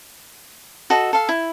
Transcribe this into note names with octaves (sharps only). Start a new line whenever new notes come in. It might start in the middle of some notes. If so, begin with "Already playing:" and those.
F#4 A4 D#5
A4 F5
E4